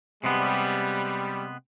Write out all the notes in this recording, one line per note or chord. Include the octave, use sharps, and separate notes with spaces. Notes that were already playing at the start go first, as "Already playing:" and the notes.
C3 G3 G#3 B3